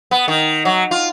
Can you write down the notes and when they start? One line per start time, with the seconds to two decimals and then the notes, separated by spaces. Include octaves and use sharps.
0.11 B3
0.28 D#3
0.65 F#3
0.91 F4